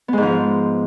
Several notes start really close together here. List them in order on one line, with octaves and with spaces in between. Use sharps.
B3 G#3 G#2 F3